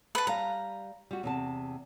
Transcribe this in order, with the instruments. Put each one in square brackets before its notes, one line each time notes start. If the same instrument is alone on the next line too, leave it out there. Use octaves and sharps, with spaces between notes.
[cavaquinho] B4 A5
[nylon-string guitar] G3 F5 [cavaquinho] A#5
[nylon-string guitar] G3 F#4
E2 C3 A5